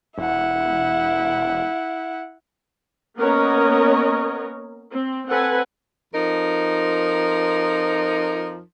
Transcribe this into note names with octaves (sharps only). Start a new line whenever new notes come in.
E1 E4 F#5
A#3 B3 C#4 A#4 C#5 D#5
C4
C4 A4 B4 F#5 G#5
F2 F3 D#4 A#4